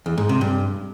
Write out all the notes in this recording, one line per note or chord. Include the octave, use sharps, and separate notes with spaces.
E2
G#2
C3
G2